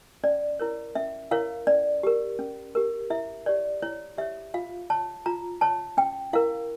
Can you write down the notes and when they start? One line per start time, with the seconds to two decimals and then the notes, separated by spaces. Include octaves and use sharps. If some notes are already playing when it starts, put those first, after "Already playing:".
0.23 C#4 D5
0.60 E4 A#4 C#5
0.95 C#4 E5
1.31 E4 A#4 C#5 F5
1.67 C#4 D5
2.03 G4 A#4
2.39 C#4
2.75 G4 A#4
3.10 E4 E5
3.46 G4 C#5 D5
3.82 E4 C#5
4.18 G4 C#5 E5
4.54 F4 F5
4.90 C#5 A5
5.26 F4 A#5
5.61 C#5 A5
5.97 C#4 G5
6.33 E4 A#4 F5